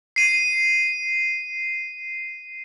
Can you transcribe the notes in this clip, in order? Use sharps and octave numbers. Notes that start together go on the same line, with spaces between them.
C7 D#7